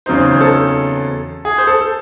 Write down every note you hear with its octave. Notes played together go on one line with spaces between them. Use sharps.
E2 C#3 F#3 C4 D#4 C5
C5
A4
G#4
C5
A4